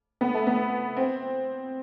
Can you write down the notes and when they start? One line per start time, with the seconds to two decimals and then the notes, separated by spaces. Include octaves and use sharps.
0.21 B3
0.34 A3
0.47 B3
0.97 C4